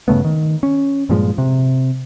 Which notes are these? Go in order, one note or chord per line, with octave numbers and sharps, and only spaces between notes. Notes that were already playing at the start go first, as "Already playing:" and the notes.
G2 C#3 A3 B3
D#3
C#4
G2 A#2 F3 G#3
C3